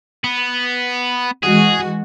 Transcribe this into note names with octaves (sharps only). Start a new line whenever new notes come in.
B3
E3 G#3 F#4 G#4